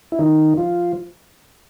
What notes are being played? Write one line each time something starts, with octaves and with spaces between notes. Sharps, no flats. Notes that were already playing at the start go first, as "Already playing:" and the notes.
E4
D#3 D#4
F3 F4